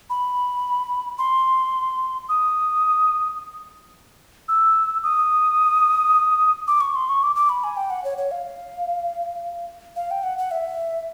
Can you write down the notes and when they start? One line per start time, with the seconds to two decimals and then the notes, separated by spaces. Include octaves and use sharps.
0.10 B5
1.18 C6
2.29 D#6
4.48 E6
5.03 D#6
6.67 D6
6.81 C#6
6.95 C6
7.09 C#6
7.23 D6
7.35 D6
7.49 B5
7.64 G#5
7.77 G5
7.90 F#5
8.05 C#5
8.18 C#5
8.31 F5
9.96 F5
10.11 G5
10.23 F#5
10.38 F#5
10.51 E5